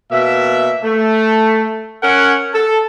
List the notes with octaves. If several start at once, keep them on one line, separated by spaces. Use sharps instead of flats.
B2 A#3 E5
A3
C#4 A#4 C#5 F#5
A4